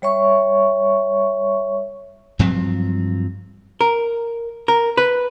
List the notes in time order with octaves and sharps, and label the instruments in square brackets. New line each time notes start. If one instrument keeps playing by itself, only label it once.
[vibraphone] G3 C#5 E5 C#6
[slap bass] G2 F3 F#3 C4
[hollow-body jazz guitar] A#4
A#4
B4